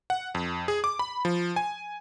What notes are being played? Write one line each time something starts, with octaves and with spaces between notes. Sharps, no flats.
F#5
F2
G#4
D6
B5
F3
G#5